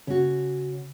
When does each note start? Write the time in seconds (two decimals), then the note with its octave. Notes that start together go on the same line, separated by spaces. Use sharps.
0.07 C#3 C#4 F#4